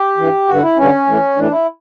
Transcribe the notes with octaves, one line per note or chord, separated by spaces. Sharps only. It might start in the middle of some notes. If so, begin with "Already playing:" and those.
Already playing: G4
G2 E3
G2 D3 F#4
E4
G2 D3 C#4
A2 E3
A2 E3 D4
E4